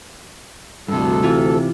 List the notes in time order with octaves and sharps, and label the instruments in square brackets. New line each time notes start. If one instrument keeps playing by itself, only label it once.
[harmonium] D2 A4 [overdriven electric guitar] G2 C3
[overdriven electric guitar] C3 [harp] E3 E4 F4